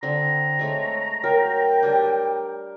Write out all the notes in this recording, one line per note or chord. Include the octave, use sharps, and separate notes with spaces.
D3 C4 A#5
G#3 A3 C#5
F#3 A#4 G5
G3 D4